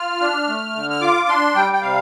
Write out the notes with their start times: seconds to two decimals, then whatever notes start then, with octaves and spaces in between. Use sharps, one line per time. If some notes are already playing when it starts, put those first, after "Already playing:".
Already playing: F4 F6
0.21 D4
0.47 A3
0.75 D3
0.90 F6
1.01 F4 D6
1.28 D4 C6
1.55 G3 G5
1.73 G5
1.82 C3 F5